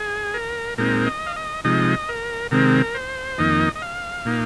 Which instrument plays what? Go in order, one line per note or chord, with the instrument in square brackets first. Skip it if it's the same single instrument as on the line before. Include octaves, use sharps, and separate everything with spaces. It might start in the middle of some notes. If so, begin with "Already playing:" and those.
Already playing: [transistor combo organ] G#4
A#4
A#2 G#3 C4 D#4 A#4
D#5
F5
D#5
C3 F3 G#3 D#4 D#5
A#4
C3 D#3 G#3 C4 A#4
C5
F2 D#3 A#3 D#4 D#5
D#5
F5
A#2 A#3 D#4